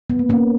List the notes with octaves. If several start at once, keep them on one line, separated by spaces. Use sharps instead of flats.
B3
A#3
A#3 C#4